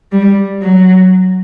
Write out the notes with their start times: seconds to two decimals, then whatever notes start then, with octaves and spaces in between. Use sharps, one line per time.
0.12 G3
0.62 F#3